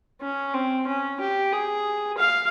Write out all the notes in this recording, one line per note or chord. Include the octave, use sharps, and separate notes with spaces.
C#4
C4
C#4
G4
G#4
F5